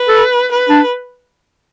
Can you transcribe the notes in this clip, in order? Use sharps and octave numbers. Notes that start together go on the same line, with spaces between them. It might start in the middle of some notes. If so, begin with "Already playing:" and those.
Already playing: B4
A4
B4
D4